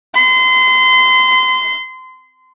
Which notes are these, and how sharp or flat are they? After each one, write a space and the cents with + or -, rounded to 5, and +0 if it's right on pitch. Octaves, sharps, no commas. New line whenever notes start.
C6 -30